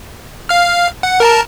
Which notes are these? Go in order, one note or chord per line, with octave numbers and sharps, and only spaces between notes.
F5 F6
F#5
A#4 A5 A#5